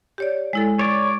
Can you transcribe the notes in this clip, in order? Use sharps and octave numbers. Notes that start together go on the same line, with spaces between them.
G4 C#5 D5
G#3 E4 A4
C#5 D5